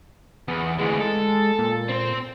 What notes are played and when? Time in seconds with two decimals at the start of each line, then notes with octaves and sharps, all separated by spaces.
0.48 E2 B3
0.79 D2 E3 G#3
1.00 A4
1.59 A#2
1.88 C4 C5